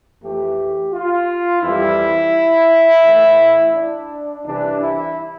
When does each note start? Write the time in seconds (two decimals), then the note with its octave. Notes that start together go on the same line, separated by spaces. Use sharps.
0.22 F2 E3 A3 G4
0.93 F4
1.63 F2 E3 G3 E4
3.05 A2 E3 A3
3.75 D4
4.45 C2 C3 E3 D4
4.80 E4